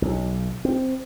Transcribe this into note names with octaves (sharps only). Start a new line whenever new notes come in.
B1
C4